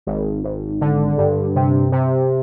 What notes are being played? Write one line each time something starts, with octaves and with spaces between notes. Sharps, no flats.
G#1
G#1
D3
G2
C3
C3